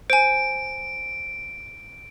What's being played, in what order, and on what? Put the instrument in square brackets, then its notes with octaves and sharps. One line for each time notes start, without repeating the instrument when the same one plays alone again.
[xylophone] C5 G#5 [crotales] D7